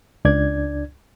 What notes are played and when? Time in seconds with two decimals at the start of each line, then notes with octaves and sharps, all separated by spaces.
0.25 C#2 D4 D5 G#6